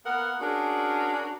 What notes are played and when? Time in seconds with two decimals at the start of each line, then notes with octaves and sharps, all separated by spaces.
0.05 A#3 B3 A#4 F#5
0.41 C#4 D4 F#4 G#4 A#4